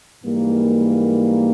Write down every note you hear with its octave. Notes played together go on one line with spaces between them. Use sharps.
G#2 E3 G3 A#3